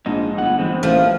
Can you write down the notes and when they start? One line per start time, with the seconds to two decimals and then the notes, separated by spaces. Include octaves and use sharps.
0.06 A#1 G#2 D#4
0.38 G1 A2 F#5
0.59 E3 G#3 C4
0.83 A1 F3 A3 A#3